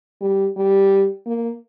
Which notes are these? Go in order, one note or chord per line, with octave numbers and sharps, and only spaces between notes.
G3
G3
A#3